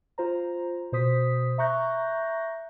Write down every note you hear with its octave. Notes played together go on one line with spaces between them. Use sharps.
F4 C5 A#5
B2 C5 D#6 B6
E5 A#5 C#6 F#6 G6 A#6